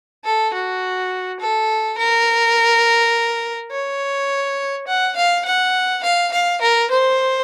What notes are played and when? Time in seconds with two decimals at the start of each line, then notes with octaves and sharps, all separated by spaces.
0.24 A4
0.53 F#4
1.40 A4
1.98 A#4
3.71 C#5
4.88 F#5
5.16 F5
5.46 F#5
6.03 F5
6.32 F5
6.62 A#4
6.91 C5